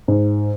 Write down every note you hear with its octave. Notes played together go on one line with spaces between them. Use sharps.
G#2